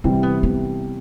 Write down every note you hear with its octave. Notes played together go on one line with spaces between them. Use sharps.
C3 E3 G3 C4
B3
B3